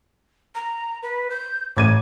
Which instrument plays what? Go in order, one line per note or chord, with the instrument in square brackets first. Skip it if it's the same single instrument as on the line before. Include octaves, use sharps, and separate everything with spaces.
[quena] A#5
B4
G6
[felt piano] A1 G#6 D#7 [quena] D6